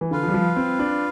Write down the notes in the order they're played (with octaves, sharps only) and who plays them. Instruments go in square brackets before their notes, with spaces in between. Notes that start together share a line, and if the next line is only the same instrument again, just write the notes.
[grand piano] E3
[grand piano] D3 [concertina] F4 B4 F5
[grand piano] F3
G3
F3
C4
D4